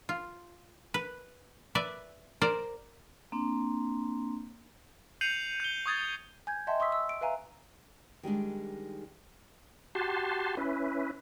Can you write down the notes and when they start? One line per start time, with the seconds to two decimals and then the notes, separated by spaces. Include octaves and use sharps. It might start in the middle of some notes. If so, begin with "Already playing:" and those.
0.09 F4
0.94 B4
1.75 B4 D5 E5
2.41 A#4 C5 D5
3.32 A#3 C4 D4 C6
5.21 G6 C7 C#7 D#7 F7 F#7
5.60 G6 G7
5.86 C#6 D#6 G#6 A6
6.47 G#5 G6 G#6
6.67 D#5 E5 F#5 G5 A5 C6
6.80 C6 C#6 D#6 E6 B6
6.92 E6
7.09 D7
7.21 B4 E5 F5 G#5 A#5
8.23 D#3 G3 G#3 D4
9.95 F#4 G4 A5 C6
10.57 C#4 E4 B4